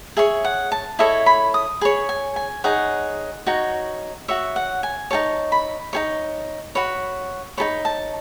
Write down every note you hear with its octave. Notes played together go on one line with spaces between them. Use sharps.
G#4 C#5 E5
F#5
A5
E4 A4 C#5 D#5
B5
D#6
G#4 C#5 B5
G#5
G#5
D#4 G#4 C#5 F#5
D#4 F#4 C#5
F#4 C#5 E5
F#5
G#5
D#4 G#4 C#5 A5
B5
D#4 G#4 C#5
F#4 C#5 B5
D#4 A4 C#5 B5
A5